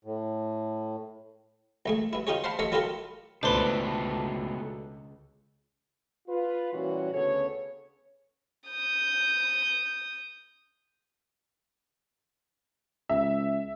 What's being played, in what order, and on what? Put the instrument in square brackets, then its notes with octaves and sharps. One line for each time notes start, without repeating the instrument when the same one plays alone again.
[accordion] A2
[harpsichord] C2 A3 G#4
G2 E4
C#4 D#4 F4 G4 G#4 C#5
C5 F5 F#5 A5 B5
A1 A4 C#5 D#5 E5 C#6
F#3 E4 F4 G4 A4 A#4
[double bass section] C#2 [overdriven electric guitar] B2 A3 [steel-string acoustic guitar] D4 A4 B4 [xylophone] C5 C6
[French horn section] F4 B4
A#2 E3 G3 C#4 F#4 C#5
D2 C#3 B3 A4 C#5
[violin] D#6 G6
[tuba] C#2 [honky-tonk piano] E5